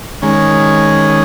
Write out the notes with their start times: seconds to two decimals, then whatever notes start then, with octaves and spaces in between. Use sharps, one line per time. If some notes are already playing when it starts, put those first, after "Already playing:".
0.22 D#3 G#3 C#4